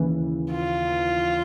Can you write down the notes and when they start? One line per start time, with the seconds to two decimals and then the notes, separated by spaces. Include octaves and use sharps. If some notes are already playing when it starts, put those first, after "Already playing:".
Already playing: D#2 C#3 E3
0.52 F4